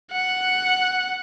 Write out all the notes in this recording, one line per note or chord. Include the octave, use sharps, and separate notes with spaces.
F#5